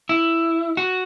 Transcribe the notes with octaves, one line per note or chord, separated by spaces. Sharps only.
E4
F#4